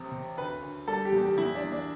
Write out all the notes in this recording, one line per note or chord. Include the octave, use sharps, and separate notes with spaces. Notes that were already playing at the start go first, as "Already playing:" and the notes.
Already playing: A1 C3
C3
D2 B4
D2
G3 A4
G4
E2
G4
E2 E4
D4
E2
D4